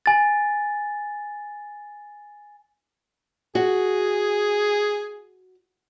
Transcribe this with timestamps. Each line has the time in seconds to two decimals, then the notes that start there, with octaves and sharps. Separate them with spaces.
0.06 G#5 A6
3.55 F#4 G#4